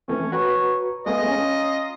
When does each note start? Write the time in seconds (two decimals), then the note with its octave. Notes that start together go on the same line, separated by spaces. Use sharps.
0.08 E3 A3 C4 C#4
0.32 F#4 B4 C#5 A#5
1.06 G#3 A3 B3 F4 D#5
1.27 C#4 A#5